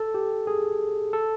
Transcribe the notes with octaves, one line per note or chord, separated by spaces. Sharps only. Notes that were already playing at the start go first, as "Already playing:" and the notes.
Already playing: A4
G4
G#4
A4